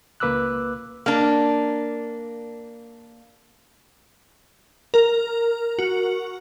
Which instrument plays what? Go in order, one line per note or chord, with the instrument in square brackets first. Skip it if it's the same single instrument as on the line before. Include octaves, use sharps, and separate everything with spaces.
[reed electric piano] C#2 A#3 B4 D6 E6 F#6
[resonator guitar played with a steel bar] A#3 D4
[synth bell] A#4
F#4